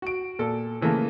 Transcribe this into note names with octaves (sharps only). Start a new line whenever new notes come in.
F#4 D7
A#2 A4
C#3 E3 A3 A#3